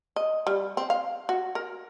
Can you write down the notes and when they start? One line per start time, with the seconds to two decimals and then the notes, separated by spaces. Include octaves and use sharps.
0.16 D#5
0.47 G3
0.77 C4
0.90 F5
1.29 F#4
1.55 A#4